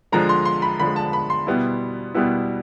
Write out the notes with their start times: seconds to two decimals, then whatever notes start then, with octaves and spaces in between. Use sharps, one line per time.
0.12 D3 F3 G#3 A#5
0.29 C6
0.45 C6
0.62 B5
0.79 D3 F3 G#3 B5
0.96 A5
1.13 B5
1.30 C6
1.47 B2 G3 B3 E4
2.14 B2 G3 B3 E4